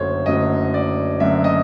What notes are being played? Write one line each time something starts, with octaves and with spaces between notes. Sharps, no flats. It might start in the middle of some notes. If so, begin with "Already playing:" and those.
Already playing: F#1 F#2 D3 F#3 A3 C5 C#5
F#1 F#2 D3 F#3 A3 D#5
D5
F#1 F#2 D3 F#3 A3 E5
D#5